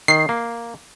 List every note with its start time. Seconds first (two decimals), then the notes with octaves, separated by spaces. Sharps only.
0.08 D#3 C7
0.29 A#3